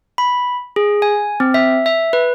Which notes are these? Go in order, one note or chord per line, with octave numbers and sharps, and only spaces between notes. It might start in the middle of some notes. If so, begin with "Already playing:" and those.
B5
G#4
G#5
C4
E5
E5
B4